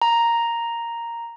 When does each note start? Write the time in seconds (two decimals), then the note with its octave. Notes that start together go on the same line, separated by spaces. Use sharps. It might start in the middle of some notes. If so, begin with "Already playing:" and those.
0.02 A#5